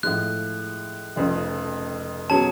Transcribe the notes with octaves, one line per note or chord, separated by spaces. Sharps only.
A2 F3 G#3 F#6
F1 F2 C#3 F3
B2 F#3 C#4 G#4 A5